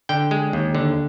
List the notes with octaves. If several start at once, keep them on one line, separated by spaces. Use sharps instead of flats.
D3 G5
G#3
D#2
D3